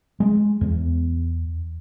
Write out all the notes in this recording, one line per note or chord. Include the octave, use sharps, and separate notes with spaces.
G#3
E2